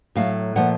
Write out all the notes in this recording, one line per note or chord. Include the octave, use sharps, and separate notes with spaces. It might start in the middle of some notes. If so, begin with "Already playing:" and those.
A2 F#3 A3 F5
A#2 F3 A3 F#5